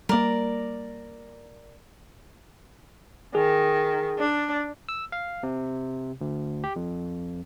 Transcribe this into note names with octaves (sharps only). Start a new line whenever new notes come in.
G3 A#3 A#4 D5
D#3 G#4
D4
E6
F5
C3
D2
G4
F2